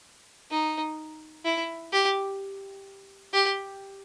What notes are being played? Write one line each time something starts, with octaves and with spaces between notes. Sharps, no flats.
D#4
E4
G4
G4